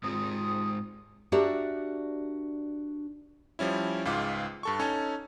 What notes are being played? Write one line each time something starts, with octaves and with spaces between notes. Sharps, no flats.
G#2 C3 G#3 C4 F4 D#6
D4 F#4 G4 A#4 D5 E5
F3 G3 C#4 E4
C#2 G#2 F4 D6
G2 A4 C#6
C#4 D#4 A4 C#5 G#5